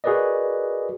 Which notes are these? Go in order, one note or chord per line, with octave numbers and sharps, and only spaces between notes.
F#4 G#4 A#4 B4 D5 D#5